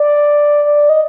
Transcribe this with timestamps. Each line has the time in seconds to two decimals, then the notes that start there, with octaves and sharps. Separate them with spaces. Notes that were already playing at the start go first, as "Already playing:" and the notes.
Already playing: D5
0.64 D5
0.89 D#5